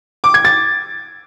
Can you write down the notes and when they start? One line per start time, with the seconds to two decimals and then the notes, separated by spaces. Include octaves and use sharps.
0.24 D6
0.34 G#6
0.45 A6